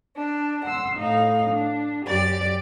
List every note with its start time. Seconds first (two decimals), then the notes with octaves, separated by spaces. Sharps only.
0.15 D4
0.65 F#5 C6 E6
0.97 A2 D#4 F5
1.51 D4
2.06 F#2 G4 D5 A6